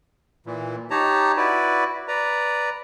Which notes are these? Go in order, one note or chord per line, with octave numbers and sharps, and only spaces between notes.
A#2 E3
D#4 G4 C#5 A5 A#5
E4 F#4 B4 D5
B4 D5 A#5